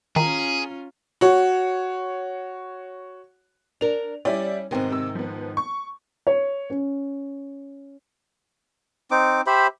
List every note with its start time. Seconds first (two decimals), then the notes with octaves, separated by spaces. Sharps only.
0.16 D#3 C#4 F4 G#4 A#5
1.21 F#4 C#5
3.81 D4 A#4 F7
4.25 G3 C#4 E4 D5
4.71 G#2 C3 D#3 B3 C4
4.90 C3 E6
5.15 F3 B3
5.57 C#6
6.27 C#5
6.70 C#4
9.11 C4 D#4 D6
9.47 G4 C5 E5 B5